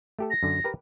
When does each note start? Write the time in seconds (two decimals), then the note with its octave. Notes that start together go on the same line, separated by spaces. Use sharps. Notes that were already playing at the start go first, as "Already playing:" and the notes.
0.19 A3 G4 A4
0.30 A#6
0.43 F#2 D3
0.64 G4 A#4 B4